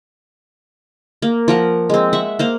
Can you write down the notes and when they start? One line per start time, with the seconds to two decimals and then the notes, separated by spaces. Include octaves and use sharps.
1.22 A#3
1.48 F3 A#4 F#5
1.90 G#3 C4
2.13 E5 F#5 C#6
2.39 A#3 C5 F5